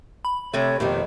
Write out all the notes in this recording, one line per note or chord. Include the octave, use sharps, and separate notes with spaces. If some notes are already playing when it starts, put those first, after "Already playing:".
B5
C3 A3 C#5
F2 B2 D#3 A3 G4